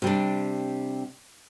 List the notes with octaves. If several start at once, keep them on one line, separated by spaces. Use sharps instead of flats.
C3 G3 D4